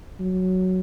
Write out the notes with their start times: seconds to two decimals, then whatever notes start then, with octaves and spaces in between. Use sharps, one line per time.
0.20 F#3